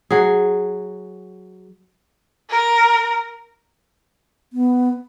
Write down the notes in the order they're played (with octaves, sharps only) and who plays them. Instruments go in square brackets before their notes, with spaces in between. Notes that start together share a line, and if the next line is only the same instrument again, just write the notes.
[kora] F#3 G#4
[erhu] A#4
[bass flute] B3